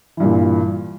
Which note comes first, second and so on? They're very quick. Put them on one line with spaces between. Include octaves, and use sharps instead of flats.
E3 G2 A#2